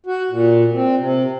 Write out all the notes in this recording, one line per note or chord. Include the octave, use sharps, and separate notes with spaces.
F#4
A#2
C4
C3